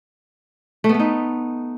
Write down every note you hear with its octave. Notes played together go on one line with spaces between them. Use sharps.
A3
B3
A3
D#4